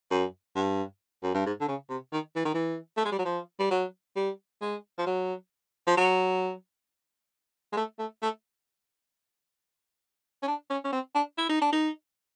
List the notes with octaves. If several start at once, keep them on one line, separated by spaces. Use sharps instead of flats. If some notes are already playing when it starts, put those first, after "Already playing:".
F#2
G2
F#2
G2
G#2
D3
C#3
C3
D#3
E3
D#3
E3
A3
G#3
G3
F#3
F3
G3
F#3
G3
G#3
F3
F#3
F3
F#3
G#3
A3
A3
A3
C#4
D4
C#4
C#4
C4
D4
E4
D#4
D4
D#4